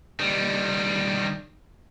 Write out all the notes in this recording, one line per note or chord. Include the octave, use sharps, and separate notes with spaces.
D#3 G3